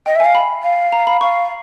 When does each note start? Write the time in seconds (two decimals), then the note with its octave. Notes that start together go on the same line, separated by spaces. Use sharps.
0.06 D#5 G5
0.16 E5 G#5
0.25 F5
0.35 B5
0.63 F5
0.92 A#5
1.07 B5
1.21 F5 C#6